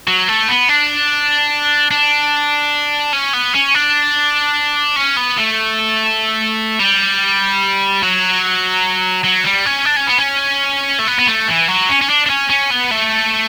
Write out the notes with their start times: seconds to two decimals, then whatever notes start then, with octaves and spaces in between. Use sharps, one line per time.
0.08 F#3
0.29 A3
0.49 B3
0.69 D4
1.91 D4
3.13 C#4
3.34 B3
3.55 C#4
3.74 D4
4.96 C#4
5.17 B3
5.38 A3
6.80 G3
8.03 F#3
9.24 F#3
9.44 G3
9.66 C#4
9.85 D4
9.96 C#4
10.07 B3
10.18 C#4
10.99 A3
11.08 B3
11.19 B3
11.28 A3
11.48 E3
11.68 F#3
11.89 C#4
12.02 C#4
12.10 D4
12.26 D4
12.30 C#4
12.50 C#4
12.71 B3
12.91 A3